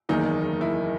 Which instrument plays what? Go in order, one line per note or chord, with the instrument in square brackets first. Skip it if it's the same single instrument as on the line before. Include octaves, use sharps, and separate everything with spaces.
[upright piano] F#1 E2 D#3 A#3 [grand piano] D#4
[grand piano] E4